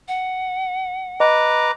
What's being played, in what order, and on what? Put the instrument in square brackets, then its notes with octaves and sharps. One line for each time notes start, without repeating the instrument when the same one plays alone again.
[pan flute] F#5
[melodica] B4 A#5 D6 [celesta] D#5